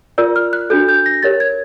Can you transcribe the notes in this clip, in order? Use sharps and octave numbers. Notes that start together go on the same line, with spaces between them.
F4 A#4 D5 E6
F6
F#6
D4 F#4 A4 G6
G6
A#6
G4 A#4 C#5 A6
G#6